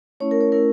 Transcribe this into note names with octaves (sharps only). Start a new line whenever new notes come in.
A3 C#4 E4 C#5
A#4
C#5
A3 C#4 E4 A#4